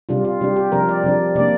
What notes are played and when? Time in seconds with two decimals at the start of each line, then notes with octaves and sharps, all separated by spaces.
0.09 C3 G3 D4 F4
0.25 F4
0.41 C3 G3 D4 G4
0.56 G4
0.72 C3 F3 D4 A#4
0.89 D5
1.04 C3 F3 D4
1.35 C3 D5
1.39 A#3 D4